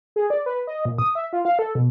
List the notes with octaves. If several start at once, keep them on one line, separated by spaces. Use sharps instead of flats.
G#4
D5
B4
D#5
A#2
D#6
E5
F4
F5
A4
B2